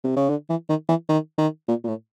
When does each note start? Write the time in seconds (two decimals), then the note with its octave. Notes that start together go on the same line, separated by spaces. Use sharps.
0.04 C3
0.16 C#3
0.29 D3
0.50 E3
0.69 D#3
0.89 E3
1.09 D#3
1.38 D#3
1.68 A#2
1.84 A#2
1.88 A2